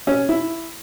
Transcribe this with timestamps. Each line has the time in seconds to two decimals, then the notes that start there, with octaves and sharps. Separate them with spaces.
0.07 C#4
0.29 E4